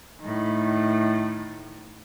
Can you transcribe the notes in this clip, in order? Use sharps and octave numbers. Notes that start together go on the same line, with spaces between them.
A2 D#3